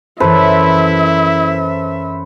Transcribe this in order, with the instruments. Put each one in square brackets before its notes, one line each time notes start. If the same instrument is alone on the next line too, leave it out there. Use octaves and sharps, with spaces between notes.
[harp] F#2 E3 [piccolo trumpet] E4 [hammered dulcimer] A4 B4 C5 [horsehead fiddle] E5